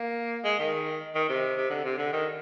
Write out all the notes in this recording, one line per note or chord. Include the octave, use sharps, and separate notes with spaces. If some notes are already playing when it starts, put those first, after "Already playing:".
Already playing: A#3
G#3
D#3
D#3
C3
C3
D3
C3
D3
D#3